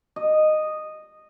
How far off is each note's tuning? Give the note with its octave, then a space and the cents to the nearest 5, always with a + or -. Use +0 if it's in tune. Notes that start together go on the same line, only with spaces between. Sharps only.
D#5 -10